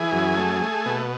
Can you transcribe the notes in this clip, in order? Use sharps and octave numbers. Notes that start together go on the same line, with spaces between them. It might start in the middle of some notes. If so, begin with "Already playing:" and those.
Already playing: E3 G#4
F#2
A3
A3
B2